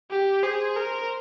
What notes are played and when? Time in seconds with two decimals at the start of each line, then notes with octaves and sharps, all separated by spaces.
0.11 G4
0.43 G#4 C5
0.76 A#4